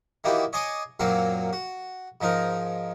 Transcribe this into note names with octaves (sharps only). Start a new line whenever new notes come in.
D#3 E3 A#3 D#4 F#4 G4
C#5 D#5 G#5 C6 D6 D#6
F#2 A#2 F#3 A#3 C4 F5
F#4
G#2 F3 D#4 A#4